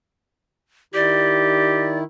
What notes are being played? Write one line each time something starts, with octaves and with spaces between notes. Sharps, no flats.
D#3 E4 G4 D5